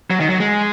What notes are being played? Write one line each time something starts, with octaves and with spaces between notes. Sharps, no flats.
F#3
D#3
F#3
G#3